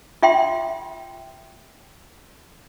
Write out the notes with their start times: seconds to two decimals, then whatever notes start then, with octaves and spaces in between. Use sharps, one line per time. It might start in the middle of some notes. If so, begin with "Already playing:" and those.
0.22 F4 E5 G5 C6